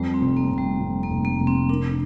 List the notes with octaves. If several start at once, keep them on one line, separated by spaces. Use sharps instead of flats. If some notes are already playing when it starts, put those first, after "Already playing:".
Already playing: F2 G3
C4
F1
A#3
F1
G3
F2
A#3
F1
A#3
F1
C4
D4 A#4